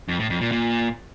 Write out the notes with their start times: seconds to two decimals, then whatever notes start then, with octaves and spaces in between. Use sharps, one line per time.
0.09 F2
0.19 A2
0.30 F2
0.41 A#2
0.52 A#2